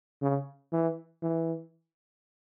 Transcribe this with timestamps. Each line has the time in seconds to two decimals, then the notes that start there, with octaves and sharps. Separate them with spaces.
0.22 C#3
0.73 E3
1.23 E3